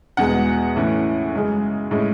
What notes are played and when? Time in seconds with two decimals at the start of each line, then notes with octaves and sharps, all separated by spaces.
0.17 E2 B2 G#3 F#5
0.76 A2 E3 A3 C#4
1.33 F#2 C#3 G#3
1.91 A2 G#3 C#4